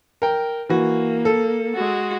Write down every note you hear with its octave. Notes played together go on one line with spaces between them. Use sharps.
A#4 G5
E3 A#3 F#4
A4
G#3 F#4